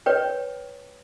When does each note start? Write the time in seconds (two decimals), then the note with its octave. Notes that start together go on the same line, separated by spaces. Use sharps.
0.06 B4 C#5 G5